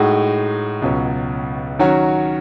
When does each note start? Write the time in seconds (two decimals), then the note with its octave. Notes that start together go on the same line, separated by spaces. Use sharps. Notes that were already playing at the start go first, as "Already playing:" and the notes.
Already playing: A2 G#3 D#4 F#4
0.82 C#2 B2 F#3 C#4
1.79 D#3 F#3 C#4 F#4